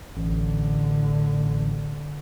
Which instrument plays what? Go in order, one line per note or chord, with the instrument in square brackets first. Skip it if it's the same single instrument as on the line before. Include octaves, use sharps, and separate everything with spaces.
[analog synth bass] A1 [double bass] D3